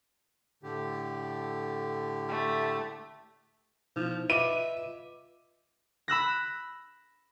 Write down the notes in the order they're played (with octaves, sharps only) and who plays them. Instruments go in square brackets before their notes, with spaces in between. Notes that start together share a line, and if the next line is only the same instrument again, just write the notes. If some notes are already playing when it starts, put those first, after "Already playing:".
[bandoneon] A2 D3 G4
[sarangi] A3
[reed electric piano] B2 [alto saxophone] F3 [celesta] D#4 E4
[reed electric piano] F4 B4 [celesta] D#5 D6 [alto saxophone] E5 [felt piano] D#7
[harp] B5 E6 F#6 A#6